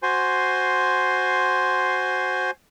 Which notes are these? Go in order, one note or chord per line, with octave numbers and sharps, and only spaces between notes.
F#4 C5 G#5 C6